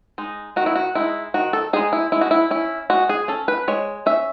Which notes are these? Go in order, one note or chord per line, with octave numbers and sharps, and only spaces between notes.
G#3 D#4
D#3 F#4
E4
F#4
G#3 D#4 E4
D#3 F#4
A4
G#3 D#4 G#4
E4
G#3 E4
F#4
E4
C#4 E4
G#3 F#4
G#4
C#4 A4
B4
G#3 C#5
C#4 E5